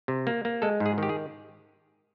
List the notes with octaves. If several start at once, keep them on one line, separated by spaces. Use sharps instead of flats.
C3
A#3
A#3
G#3 A4
G#2
G#4
D#3 G4
G#4